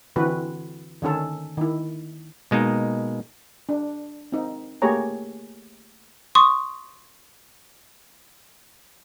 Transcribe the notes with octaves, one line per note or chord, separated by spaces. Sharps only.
D3 E3 C4 F#4 B4
D3 D#3 C#4 A4
D#3 E4
B2 G#3 A#3 D#4
D4
C4 D#4
A3 A#3 G4 G#4 C#5 A#5
C6 C#6 D#6